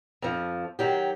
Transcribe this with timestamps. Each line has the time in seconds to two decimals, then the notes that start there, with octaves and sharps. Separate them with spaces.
0.22 F2 F3
0.79 D#3 F#3 G4